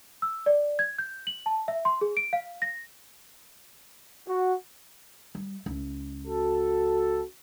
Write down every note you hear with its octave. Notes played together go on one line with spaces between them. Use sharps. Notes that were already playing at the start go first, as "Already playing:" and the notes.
E6
D5
G#6
G6
F#7
A5
E5
C6
G#4
D7
F5
A#6
F#4
G3
C#2 E4
F#4 A4